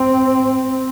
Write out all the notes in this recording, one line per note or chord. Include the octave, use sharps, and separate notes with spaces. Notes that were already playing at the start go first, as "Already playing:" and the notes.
Already playing: C4